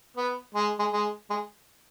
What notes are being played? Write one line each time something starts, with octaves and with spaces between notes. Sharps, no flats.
B3
G#3
G#3
G#3
G#3